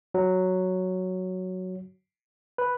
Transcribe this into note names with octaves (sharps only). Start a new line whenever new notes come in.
F#3
B4